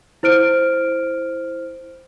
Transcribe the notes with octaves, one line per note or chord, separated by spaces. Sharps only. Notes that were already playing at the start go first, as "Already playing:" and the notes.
E4 C5 F6 D7